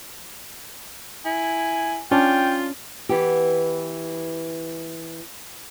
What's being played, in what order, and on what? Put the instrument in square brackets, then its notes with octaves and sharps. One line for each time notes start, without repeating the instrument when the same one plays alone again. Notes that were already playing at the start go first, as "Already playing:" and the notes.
[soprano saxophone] E4 [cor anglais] G#5
[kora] C#4 D4 [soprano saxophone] F4 [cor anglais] G5
[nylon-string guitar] E3 B3 G4